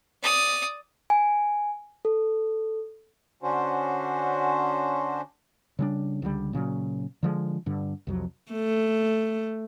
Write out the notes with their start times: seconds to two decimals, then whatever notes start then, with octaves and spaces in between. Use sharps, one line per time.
0.23 D5 D#6
1.10 G#5
2.05 A4
3.43 D3 C#4 D4 F#4 C5
5.79 C#3 G3 D4
6.22 C#2 D3 E3 G3
6.53 A#2 C#3 E3 F#3
7.23 D3 F3 G#3
7.66 G2 D3
8.07 C2 F2 F#3
8.52 A3